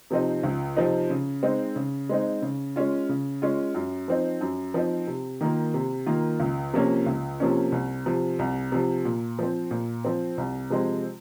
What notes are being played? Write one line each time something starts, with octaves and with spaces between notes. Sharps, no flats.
C3 F3 C4 D#4
C#2
C3 F3 C4 D#4
C#3
G#3 C4 D#4
C#3
G#3 C4 D#4
C#3
G#3 C#4 F4
C#3
G#3 C#4 F4
F#2
F3 C4 D#4
F#2
F3 C4 D#4
C3
D#3 A#3 F4
C3
D#3 A#3 F4
C#2
C3 F3 A#3 C#4
C#2
C3 F3 A#3 C#4
C2
C3 F3
C2
C3 F3
A#2
F3 C4
A#2
F3 C4
C2
C3 F3 G#3 C4